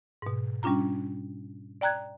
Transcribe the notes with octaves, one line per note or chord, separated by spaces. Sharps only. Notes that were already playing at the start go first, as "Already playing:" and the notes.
G#2 B2
G3 C#4 D4 F4 A#5
D5 G5 A#5 F#6 G#6